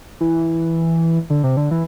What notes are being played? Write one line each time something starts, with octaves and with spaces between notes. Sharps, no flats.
E3
D3
C3
D3
E3